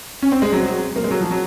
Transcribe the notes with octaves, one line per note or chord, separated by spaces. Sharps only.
C#4
C4
G#3
F#3
F#3
A#3
G#3
F#3
F3
F#3